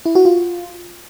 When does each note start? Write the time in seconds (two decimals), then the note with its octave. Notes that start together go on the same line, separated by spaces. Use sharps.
0.06 E4
0.15 F#4
0.25 F4